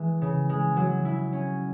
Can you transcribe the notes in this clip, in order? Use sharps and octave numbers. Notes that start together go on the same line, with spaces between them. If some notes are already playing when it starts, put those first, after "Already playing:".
Already playing: E3 G#3
C#3
G#3
F#3
E4
C#4